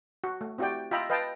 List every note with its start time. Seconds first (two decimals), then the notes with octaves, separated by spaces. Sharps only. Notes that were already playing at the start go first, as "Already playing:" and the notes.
0.24 F#4
0.41 A3
0.58 C4 E4 F#4 G4 D5 G5
0.91 F4 D#5 E5 G5 A#5 B5
1.10 B4 D#5 F5 G5 A5